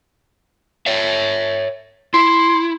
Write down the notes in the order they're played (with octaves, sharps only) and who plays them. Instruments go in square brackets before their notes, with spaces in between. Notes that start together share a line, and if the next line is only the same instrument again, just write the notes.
[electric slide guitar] C#5 E5
[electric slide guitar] E4 [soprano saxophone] C6